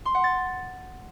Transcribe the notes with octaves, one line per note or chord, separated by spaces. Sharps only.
C6
F#5
A6